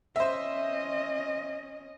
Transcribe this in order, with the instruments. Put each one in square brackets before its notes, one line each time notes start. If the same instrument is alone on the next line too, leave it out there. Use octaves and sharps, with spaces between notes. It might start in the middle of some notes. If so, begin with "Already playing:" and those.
[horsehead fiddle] C#4 D#5 [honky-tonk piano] C5 E5